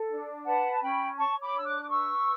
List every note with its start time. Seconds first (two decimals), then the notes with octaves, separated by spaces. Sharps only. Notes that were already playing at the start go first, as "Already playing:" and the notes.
Already playing: A4
0.10 D4
0.45 B4 F#5 A5
0.70 A5
0.81 C#4 G5 B5
1.18 C#5 A5 C#6
1.41 B5 D6
1.54 D4 E6
1.65 D6 F#6
1.82 D6
1.89 B4 C#6 E6